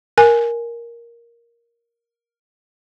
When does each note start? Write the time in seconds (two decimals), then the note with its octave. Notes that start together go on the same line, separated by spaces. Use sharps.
0.18 A#4 G#5